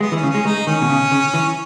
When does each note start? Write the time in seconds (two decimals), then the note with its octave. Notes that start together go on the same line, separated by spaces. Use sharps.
0.01 G#3 B3
0.12 E3
0.16 C#4
0.23 C#3
0.30 G#3 C#4
0.45 G#3 D#4
0.67 D#3 C#4
0.82 B2
0.89 C#3
1.12 C#3
1.34 E3